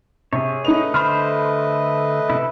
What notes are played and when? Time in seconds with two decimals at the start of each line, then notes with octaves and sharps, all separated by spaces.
0.33 C3 G#4 C#5
0.64 A3 D#4 B4 D#5 F7
0.94 D3 C5 B5 C6 F6
2.30 C3 E4 A4